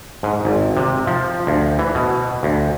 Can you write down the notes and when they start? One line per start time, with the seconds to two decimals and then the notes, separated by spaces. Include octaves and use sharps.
0.23 G#2
0.45 G#1
0.77 C3
1.07 F3
1.47 D2
1.79 E3
1.95 B2
2.43 D2